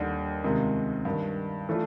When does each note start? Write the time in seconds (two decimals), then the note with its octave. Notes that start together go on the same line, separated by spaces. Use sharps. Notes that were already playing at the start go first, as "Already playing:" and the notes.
Already playing: D#2 D3 G3
0.43 C#2 C3 D#3 G#3
1.05 G2 D#3 G3
1.69 E3 A3 D4 F4